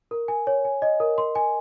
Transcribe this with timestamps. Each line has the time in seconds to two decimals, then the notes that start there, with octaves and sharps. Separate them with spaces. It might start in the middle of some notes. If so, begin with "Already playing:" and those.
0.11 A#4
0.28 G#5
0.47 C#5
0.65 G#5
0.82 D#5
1.00 A#4
1.18 C6
1.35 G#5